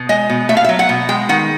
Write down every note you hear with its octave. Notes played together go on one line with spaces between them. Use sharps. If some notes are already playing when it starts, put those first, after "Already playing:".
Already playing: B2
G#3 D#5
B2
A3 E5
F5
E5
F#3
F#5
B2
G#3 G5
D#3 F#5